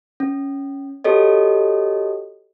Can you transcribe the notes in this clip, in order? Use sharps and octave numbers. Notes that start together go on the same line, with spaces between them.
C#4
F#4 G4 A4 C#5 D#5